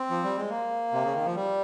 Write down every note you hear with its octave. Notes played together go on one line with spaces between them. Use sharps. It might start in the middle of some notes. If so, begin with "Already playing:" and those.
Already playing: C4
F3
G3
G#3
A#3
C3
C#3
D#3
F3
G3